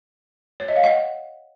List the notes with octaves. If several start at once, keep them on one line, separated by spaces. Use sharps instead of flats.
C#5
D#5
F5
D#5 F#5